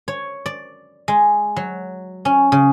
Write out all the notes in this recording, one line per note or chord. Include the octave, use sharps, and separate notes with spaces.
C#5
D5
G#3
F#3
C#4
C#3